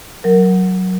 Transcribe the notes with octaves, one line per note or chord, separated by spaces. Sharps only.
F#3 A#4